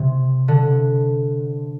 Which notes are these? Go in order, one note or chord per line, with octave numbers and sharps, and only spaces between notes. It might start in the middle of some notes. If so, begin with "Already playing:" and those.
Already playing: C3
D3